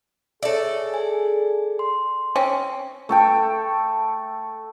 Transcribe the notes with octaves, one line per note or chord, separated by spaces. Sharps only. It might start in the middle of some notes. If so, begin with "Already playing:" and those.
G#4 A4 C#5 D5 E5
G#5
C6
C4 C#4
A3 A4 G5